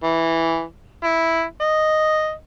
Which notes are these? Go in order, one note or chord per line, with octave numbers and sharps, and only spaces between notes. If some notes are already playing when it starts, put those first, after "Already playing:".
E3
E4
D#5